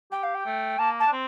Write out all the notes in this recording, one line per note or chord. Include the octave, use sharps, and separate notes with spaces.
G4 G5
F5
G5
A3
A#3 A5
A5
D4
C4